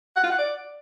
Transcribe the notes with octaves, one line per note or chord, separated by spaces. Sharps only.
F#5
F4
F#5
D5